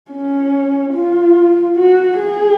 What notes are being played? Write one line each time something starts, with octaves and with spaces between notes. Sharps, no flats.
C#4
F4
F#4
G#4